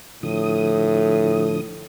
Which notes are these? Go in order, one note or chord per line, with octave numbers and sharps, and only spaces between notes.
A2 D3 F3 D#6